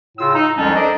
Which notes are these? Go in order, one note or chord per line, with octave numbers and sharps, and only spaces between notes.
A2 C#3 F4 E6
D#4
C2 F2 F3 G#3 C#4 A5
D4 A4 A#4 C5 D5 D#5